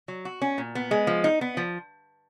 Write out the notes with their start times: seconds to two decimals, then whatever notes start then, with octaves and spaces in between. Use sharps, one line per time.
0.08 F#3
0.25 F#4
0.42 C#4
0.58 A#2
0.75 B3
0.91 G#3
1.07 F3
1.24 D#4
1.41 B3
1.57 F3